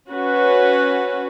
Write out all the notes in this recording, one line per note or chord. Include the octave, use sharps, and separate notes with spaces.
C#4 F#4 B4